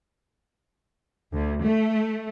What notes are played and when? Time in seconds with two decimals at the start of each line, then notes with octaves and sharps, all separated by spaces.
1.33 D2
1.64 A3